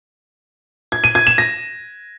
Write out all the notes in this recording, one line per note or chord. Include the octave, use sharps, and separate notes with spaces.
G#6
D#7
G#6
E7
A#6